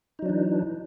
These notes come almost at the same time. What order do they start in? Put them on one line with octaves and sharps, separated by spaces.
D#4 F#3 D4 E3